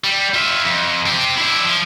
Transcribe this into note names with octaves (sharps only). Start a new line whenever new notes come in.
G3
F4 E5
F2
C4 G4
D4 E4
F3